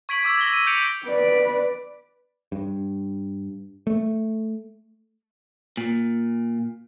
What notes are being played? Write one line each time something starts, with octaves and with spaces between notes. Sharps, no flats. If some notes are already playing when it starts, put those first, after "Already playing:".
C#6 G#6 B6 D7 F#7
C#6 D6 E6 G#6
A#6 G7
D#7
G6 C#7 D7 F7
B4 D5
G2
A3
A#2